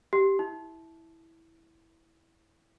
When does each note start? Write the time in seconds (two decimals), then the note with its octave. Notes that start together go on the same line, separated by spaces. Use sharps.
0.13 G4
0.39 E4